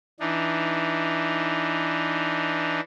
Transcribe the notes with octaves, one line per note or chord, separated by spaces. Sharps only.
E3 D4 D#4